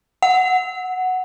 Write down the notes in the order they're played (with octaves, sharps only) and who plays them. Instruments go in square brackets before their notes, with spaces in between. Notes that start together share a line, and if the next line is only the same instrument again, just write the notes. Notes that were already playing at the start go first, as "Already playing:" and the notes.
[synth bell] F#5